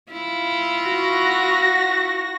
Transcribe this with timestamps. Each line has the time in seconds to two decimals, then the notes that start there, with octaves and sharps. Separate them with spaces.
0.12 E4 F4
0.83 F#4 A#6